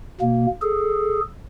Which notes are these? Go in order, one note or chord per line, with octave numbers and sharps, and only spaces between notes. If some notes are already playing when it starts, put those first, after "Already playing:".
B2 A#3
G#4 A4